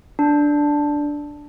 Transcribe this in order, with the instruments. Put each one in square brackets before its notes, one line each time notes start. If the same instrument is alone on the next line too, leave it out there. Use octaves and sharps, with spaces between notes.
[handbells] D4